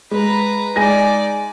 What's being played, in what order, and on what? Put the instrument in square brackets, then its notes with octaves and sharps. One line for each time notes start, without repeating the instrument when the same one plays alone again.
[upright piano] G#3 [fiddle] B4 A#5
[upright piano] G#3 G#5 A#6 [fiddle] D#4 D5